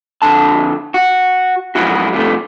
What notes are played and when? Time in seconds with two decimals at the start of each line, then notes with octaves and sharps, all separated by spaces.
0.22 F2 D3 A5
0.94 F#4
1.75 G#2 C3 F3 F#3 E4 F#4
2.13 G2 C3 F3 A3